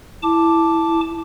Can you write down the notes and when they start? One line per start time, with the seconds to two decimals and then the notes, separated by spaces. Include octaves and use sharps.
0.23 E4 A5 D6